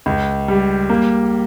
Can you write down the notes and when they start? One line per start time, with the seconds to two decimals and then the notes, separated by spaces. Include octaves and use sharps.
0.06 C#2
0.48 G3
0.90 A#3